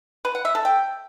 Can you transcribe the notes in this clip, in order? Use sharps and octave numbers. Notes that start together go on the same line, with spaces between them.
B4
F#5
E5
A4
G5